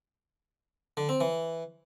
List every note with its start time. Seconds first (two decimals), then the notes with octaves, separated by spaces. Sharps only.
0.97 D3
1.09 C4
1.20 E3